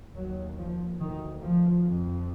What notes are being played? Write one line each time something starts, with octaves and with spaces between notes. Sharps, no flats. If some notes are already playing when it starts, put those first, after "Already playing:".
D#2 F#3
F3
D2 D#3
F3
F2